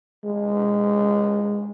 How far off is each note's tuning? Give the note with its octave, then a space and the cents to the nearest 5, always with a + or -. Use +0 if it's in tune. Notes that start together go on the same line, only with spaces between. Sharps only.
G#3 -15